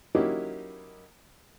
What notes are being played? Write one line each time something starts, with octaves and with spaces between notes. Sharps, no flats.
F#3 A#3 C#4 D#4 E4 G4